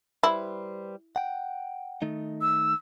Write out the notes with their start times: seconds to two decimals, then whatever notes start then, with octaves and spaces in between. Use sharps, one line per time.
0.23 G3 E4 B4 C5
1.16 F#5 G5
2.02 D#3 A3 D#4
2.41 E6